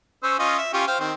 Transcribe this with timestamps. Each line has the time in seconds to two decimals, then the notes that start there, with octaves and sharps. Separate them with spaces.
0.23 C#4 C5 E6
0.39 C#4 F4 D#5
0.59 E5
0.74 C#4 F4 G4
0.88 C5 F5 G5
1.00 D#3 C4